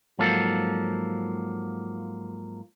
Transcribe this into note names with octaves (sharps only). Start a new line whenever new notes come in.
G#2 F3 F#3 A#3 A4